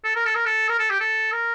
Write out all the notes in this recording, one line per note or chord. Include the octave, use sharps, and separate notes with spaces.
A4
A#4
A4
A#4
A4
A#4
A4
G4
A4
A#4